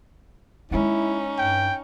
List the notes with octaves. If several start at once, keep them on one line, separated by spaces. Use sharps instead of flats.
G#3 A#3 C#4 D#4 E4
G2 G5